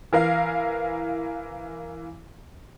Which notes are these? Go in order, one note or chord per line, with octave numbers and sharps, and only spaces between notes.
E3 A#4 F5